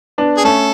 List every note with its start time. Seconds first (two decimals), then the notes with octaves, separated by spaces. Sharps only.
0.18 B3 D4
0.37 G#4
0.44 A3 C#4 A4